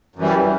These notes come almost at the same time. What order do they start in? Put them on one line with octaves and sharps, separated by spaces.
F#2 E3 G3